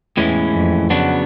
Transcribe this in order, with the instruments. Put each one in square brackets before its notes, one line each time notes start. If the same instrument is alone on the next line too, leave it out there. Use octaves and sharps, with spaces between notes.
[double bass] E2 [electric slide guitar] A2 E3 G#3 C#4 E4
[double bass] F2
[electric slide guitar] C#3 F#3 B3 D4 F#4